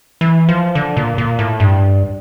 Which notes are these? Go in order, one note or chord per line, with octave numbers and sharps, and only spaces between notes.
E3
F3
D3
A#2
A#2
A2
G2